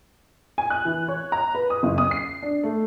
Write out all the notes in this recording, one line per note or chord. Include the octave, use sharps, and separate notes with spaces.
G#5
F#6
E3
C#5
A#5
B4
D#6
F#1
D#6
C7
D4
A3